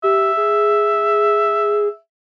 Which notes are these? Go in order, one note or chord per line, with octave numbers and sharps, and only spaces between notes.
G4 E5
G#4